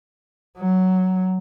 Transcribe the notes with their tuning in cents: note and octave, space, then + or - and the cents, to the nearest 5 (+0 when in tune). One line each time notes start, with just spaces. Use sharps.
F#3 +5